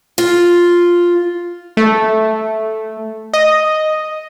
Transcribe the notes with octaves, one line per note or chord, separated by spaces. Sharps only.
F4
A3
D#5